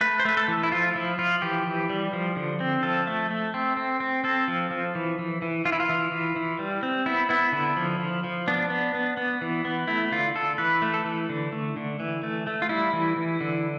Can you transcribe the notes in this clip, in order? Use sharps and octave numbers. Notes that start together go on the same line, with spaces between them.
A3 B4
C5
A3 B4
A4
E3
E4
F3 F4
F3 E4
F3 F4
E3 G4
E3
G3
F3
D3
C4
F3 A4
A3
A3
C4
C4
C4
C4 A4
F3
F3
E3
E3
E3
E3 F4
E4
F4
E3
E3
E3
G3
C4
B3 E4
B3 E4
D3 E4
F3
F3
F3
B3 D4
B3
B3
B3
E3
B3
A3 E4
D3 F4
D3 A4
E3 B4
A3
A4
E3
D3
A3
D3
E3
A3
A3
F4
G3 E4
E3
E3
D3